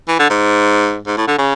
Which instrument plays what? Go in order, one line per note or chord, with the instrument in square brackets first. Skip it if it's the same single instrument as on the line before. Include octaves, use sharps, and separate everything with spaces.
[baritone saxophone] E3
D3
G#2
G#2
A2
D3
C#3